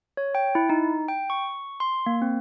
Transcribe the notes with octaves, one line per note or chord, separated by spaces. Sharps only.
C#5
G5
E4
D#4
G5
C#6
C6
A#3
C4